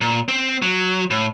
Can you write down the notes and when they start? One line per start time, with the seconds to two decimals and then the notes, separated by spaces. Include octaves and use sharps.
0.01 A#2
0.28 C4
0.62 F#3
1.11 A2